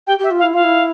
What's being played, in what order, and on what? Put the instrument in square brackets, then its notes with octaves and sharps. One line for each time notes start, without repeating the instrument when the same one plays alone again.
[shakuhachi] G4 [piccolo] G5
[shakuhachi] G4 [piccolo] E5
[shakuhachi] F4
[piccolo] F5
[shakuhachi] E4
[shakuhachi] F4 [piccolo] F5
[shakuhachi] E4